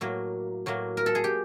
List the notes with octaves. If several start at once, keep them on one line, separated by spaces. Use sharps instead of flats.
A2 F#3 A#3
A2 F#3 A#3
A#4
A4
G#4
G4